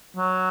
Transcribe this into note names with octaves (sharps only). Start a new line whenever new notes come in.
F#3